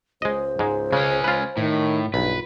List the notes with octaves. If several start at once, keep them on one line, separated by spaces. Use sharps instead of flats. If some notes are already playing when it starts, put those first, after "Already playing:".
C#2 G#3 C5 D#5
G#2 G#3
C#3 G#3 C#4
F4 B4
A2 D#3
B1 G2 F4 B4